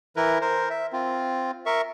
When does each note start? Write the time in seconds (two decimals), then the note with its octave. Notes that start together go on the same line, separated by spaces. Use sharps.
0.16 E3 E4 A#4 B4
0.41 A#4 C5
0.70 E5
0.93 C4 F4
1.66 A#4 E5 C#6